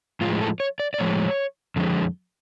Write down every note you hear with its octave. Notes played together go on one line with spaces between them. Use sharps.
A2 F3 G#3 F4
A4
C#5
D5
D5
A2 F3 G#3 C#5
F2 D3 F3 G#3